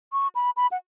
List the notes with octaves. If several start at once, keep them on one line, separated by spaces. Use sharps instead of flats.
C#6
B5
B5
F#5